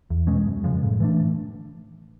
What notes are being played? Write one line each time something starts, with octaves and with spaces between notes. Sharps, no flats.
E2
B2 G#3 C#4
F#2
C#3 F3 G#3
A2
E3 A3 D4